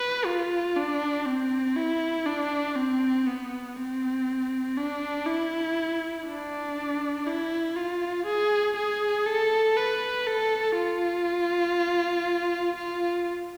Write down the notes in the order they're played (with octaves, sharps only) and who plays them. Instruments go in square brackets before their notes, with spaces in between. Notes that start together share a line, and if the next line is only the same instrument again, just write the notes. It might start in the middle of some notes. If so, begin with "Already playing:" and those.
Already playing: [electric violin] B4
F4
D4
C4
E4
D4
C4
B3
C4
D4
E4
D4
E4
F4
G#4
G#4
A4
B4
A4
F4
F4